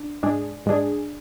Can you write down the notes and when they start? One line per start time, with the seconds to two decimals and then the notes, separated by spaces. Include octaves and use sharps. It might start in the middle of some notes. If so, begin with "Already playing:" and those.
Already playing: D4
0.23 G#2 G#3 D4 G#4
0.66 G#2 G#3 D4 G#4